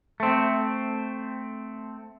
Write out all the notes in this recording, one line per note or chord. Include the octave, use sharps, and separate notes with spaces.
A3 C4